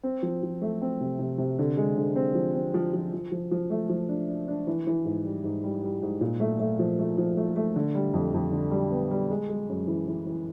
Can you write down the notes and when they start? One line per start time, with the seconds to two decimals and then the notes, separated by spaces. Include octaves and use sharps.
0.03 C4
0.23 F3
0.43 F3
0.62 A3
0.82 C4
1.01 C3
1.19 C3
1.38 C3
1.59 D3
1.77 G#3
1.97 D3
2.16 C4
2.35 F3
2.55 C4
2.74 F3
2.94 F3
3.13 F3
3.32 F3
3.51 F3
3.70 A3
3.89 F3
4.09 D4
4.29 D4
4.48 D4
4.67 E3
4.87 E3
5.05 G#2
5.25 G3
5.44 G#2
5.64 G3
5.83 G3
6.02 G#2
6.21 A#2
6.40 A3
6.60 A3
6.79 F3
6.99 A3
7.18 F3
7.37 A3
7.56 A3
7.76 D3
7.95 G3
8.14 F2
8.34 F2
8.52 D3
8.71 G3
8.91 B3
9.11 G3
9.30 G#3
9.49 G#3
9.69 F#2
9.87 E3
10.08 E3
10.27 E3